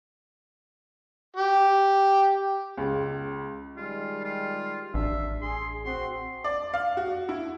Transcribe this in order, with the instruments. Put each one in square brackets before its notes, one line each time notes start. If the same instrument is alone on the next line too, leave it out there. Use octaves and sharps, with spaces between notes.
[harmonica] G4
[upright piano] C#2
[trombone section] D#3 G3 G#3 [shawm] F4
[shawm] F4
[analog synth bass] A1 [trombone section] D4 [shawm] E5
[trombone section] G#4 [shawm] C6
[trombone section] C4 F#4 [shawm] C6
[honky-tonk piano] D5
F5
F#4
E4